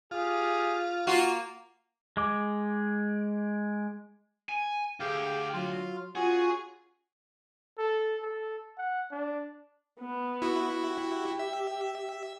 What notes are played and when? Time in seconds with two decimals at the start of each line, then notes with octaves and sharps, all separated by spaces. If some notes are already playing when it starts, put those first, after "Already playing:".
0.11 F4 G4 G#4
1.07 A#3 F4 F#4
2.17 G#3 D6
4.49 G#5
5.00 D2 G4 G#4 F5 G5
5.53 F#3 F4 F5
6.15 C#4 F4 F#4 G#4 F#5
7.79 A4
8.22 A4
8.78 F#5
9.11 D4
10.00 B3
10.42 E4 F#4
10.88 G4
11.39 E5